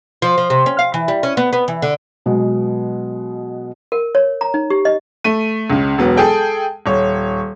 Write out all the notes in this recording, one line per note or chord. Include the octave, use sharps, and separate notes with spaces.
F3
F3
C3
C#4
F5
E3
G3
C#4
B3
B3
E3
D3
B2 F#3 G#3 B3
A#4
C#5
A#5
D#4
G4
D#5
A3 D#7
C#2 C#3
E1 F#3 B3
G#4 A4 G5 G#5
D#1 C#5